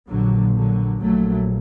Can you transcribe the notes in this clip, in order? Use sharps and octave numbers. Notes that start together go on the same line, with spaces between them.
A#1 A#2 D3 F#3
D3 F#3
A#1 A#2 F#3 A3